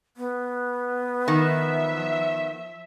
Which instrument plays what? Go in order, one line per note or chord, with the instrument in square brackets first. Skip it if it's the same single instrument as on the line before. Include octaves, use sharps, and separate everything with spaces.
[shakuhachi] B3
[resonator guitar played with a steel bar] D#3 [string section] F3 E5